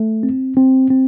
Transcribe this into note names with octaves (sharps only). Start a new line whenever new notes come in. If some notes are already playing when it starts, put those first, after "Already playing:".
Already playing: A3
C4
C4
C4